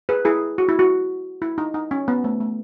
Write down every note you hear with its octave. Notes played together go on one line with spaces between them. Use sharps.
G#4 B4
E4 G#4
F#4
E4
F#4
E4
D#4
D#4
C#4
B3
A3
A3